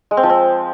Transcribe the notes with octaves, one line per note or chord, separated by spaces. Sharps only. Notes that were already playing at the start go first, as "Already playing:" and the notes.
G#3
C4
F3
C4